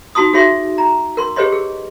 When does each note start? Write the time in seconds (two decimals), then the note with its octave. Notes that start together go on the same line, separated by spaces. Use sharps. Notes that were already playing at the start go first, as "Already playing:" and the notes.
0.15 D#4 F4 F#4 A5 C6 D#6
0.33 D#4 F#4 G#4 C#5 E5 C6
0.78 A#5
1.17 A#4 C6
1.36 G4 G#4 B4 C#5 D#5 C6
1.52 G#4